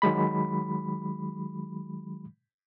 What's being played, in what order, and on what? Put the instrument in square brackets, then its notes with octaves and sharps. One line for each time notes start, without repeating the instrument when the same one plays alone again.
[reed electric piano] D#3 F#3 G#3 B5